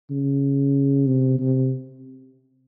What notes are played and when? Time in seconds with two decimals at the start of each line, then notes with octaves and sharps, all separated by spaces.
0.11 C#3
1.07 C3
1.39 C3